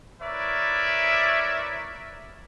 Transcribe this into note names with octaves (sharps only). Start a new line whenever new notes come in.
E4 A#4 B4 C#5 D5 E5